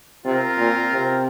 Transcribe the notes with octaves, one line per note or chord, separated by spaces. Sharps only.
C3 C4 F4 A#4
A#2
C3